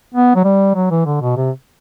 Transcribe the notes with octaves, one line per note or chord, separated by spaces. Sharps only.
B3
F#3
G3
F#3
E3
D3
B2
C3